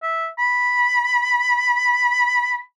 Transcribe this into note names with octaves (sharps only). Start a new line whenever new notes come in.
E5
B5